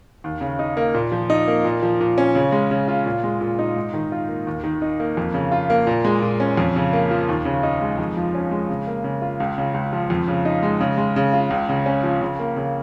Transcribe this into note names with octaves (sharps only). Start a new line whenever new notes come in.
D#2
C#3
D#4
A#3
A#2
F3
D#4
A#3
A#2
F3
A#2
C#4
C#3
G#3
C#3
F4
A#2
G#3
A#2
D#4
G#2
D#3
F4
A#3
D#2
D#3
D#4
A#3
F2
C#3
F4
A#3
A#2
G#3
A#2
C#4
F2
C#3
A#3
F3
D#2
C#3
D#4
G#3
F2
F3
C#4
G#3
C#3
A#3
C#3
F4
C#2
C#3
C#2
F3
F2
C#3
D#4
G#3
C#3
G#3
C#3
F4
C#2
C#3
C#4
F3
C#3
A#3
C#3